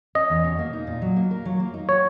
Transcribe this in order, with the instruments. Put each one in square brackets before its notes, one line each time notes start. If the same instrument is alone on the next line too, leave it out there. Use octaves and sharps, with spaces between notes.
[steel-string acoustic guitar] C#4 [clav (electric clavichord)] D#5
[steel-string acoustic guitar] E2
B2
A#3
D#4
A#2
F#3
A#3
A#4
F#3
A#3
D#4
[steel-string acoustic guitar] F#4 [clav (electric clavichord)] C#5